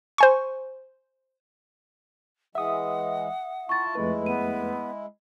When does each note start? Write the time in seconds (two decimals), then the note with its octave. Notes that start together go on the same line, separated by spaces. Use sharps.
0.18 C5 G#5 C#6
2.55 E3 G#3 E5 F#5 D#6
3.69 E4 F4 A5 C#6 A6
3.95 F2 G#3 A3 E4 B4
4.26 B3 D#7